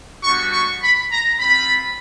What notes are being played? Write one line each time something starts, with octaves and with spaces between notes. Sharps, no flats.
G3 B3 D4 F#4 C#6
C#6
B5
A#5
C4 F4 B5